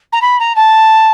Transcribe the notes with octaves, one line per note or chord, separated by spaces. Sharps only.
A#5
B5
A#5
A5